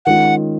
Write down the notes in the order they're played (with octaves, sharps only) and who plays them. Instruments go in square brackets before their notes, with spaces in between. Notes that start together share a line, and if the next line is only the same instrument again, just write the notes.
[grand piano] D#3 G#3 C#4 F4 [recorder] F#5